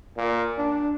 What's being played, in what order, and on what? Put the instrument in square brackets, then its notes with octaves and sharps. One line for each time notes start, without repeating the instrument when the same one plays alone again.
[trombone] A#2
D4